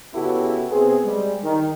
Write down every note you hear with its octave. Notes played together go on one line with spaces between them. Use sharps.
C#3 B3 E4 F#4 G4 A4
C3 B3 C4 G#4
G3 G#3
D#3